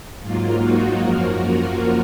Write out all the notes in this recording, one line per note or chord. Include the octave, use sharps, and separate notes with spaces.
G#2 F#3 A#3 F4
D#4 F#4
F#2 F3 A#3 F#4 A#4
F4